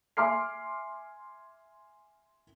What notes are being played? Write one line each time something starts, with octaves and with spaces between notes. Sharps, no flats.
E5 G#5 C6 D6 F6 C7